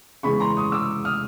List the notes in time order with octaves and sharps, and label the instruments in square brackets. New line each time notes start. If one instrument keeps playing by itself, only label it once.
[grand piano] C#3 E3 G#3 B5 C#6
A#5 C6
C#6 D#6
D6 E6
D#6 F6